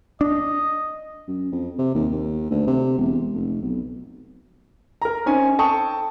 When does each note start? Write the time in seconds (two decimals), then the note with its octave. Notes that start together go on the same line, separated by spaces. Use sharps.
0.21 D4 D#5
1.28 F#2
1.52 F2
1.79 C3
1.95 D#2
2.12 D#2
2.51 D2
2.67 C3
2.98 E1
3.34 F1
3.62 B1
5.02 A#4 A#5
5.26 C4 C#4 D#4 G#5
5.59 A4 G5 A5 C#6 D#6